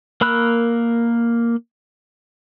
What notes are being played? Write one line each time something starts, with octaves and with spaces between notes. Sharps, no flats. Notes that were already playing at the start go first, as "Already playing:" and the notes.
A#3 A#4 B5 E6 F#6